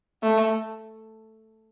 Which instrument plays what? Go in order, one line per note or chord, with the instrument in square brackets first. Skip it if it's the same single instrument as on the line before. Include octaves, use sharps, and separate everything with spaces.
[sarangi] A3